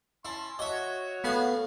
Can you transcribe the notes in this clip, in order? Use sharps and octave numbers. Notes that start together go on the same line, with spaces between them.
C#4 E4 A5 C6
F#4 C#5 D#5 E5
A2 B3 G#4 F5